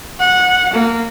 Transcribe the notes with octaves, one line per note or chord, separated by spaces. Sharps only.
F#5
A#3